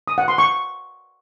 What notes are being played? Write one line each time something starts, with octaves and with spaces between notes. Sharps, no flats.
D#6
F#5
C6
C#6